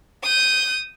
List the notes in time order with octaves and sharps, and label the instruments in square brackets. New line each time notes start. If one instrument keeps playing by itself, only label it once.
[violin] D#6 G6